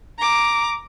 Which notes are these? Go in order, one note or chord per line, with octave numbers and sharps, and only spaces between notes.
A#5 D6